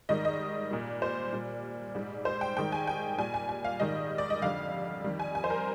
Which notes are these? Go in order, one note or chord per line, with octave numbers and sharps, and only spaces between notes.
G#2 D#3 G3 D#5
D#5
A#2 G3
C5
A#2 G3
G#2 G3
C5
G5
G#2 D#3 G3 G5
G#5
G5
A#2 G3 G#5
G#5
G#5
F5
G#2 D#3 G3 D#5
D5
D#5
F2 D3 G3 F5
F2 D#3 G3
G#5
G#5
C5
A#4